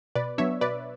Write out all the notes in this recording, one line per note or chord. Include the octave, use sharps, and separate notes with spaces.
B2 B4 D5
F#3 B3 D4 C#5 E5
B2 B4 D5